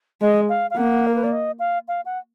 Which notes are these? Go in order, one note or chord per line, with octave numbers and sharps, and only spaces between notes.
G#3 D#5
F5
F5
A#3 F#5
A#4
B4
D5
D#5
F5
F5
F#5